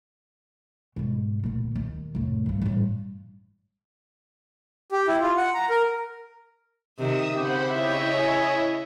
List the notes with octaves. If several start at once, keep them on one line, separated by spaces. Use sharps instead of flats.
G#2 B2
D2 A#2
D#2
F1 A2
G2 D3
A1 G2
G4
E4
F4
F#5
A#5
A#4
C3 D#3 E5 D#6 E6
C#3 C4 C#4 G4 C5 F#5 B5
E4 C#5 D#5 E5
G#5